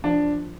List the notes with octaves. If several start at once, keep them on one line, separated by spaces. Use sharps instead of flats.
F3 D4